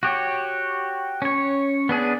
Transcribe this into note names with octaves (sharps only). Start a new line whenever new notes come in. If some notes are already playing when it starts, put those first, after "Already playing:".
F#4 G4 C#5
C#4 C#5
B3 D4 G#4